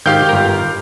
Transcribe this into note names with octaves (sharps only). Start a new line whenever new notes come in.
G#1 D#3 G4 F5 G5 G6
G1 A#4